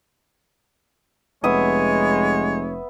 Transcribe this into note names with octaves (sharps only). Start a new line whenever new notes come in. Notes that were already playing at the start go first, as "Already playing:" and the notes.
F1 G#3 B3 C#5 E5 D#6